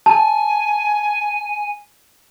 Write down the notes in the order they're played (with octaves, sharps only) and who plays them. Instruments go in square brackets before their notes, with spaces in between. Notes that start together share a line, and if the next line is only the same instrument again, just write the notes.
[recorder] G#5 [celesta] A5